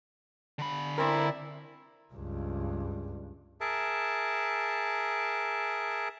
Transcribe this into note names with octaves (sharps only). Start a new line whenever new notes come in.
D3 B5
C4 E4 A#4 D5 A#5 D6
C#2 G2
G#4 A#4 E5 A5